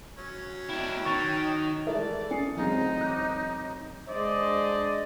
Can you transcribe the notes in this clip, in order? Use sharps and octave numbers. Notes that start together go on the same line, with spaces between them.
F#3 C#4
D4 E4 G5
D#3 C#6 A6
D#5
E3 G#3 A4 A#4 D5 E5
C#4 D#6 C7 C#7
C#2 F#2 F#3 G#3 C4 D#4
A2 D3
E1 C#5 D6 F#6
G#3 D4 C5 D5 D#5